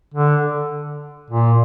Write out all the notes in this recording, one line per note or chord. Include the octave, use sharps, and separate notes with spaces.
D3
A#2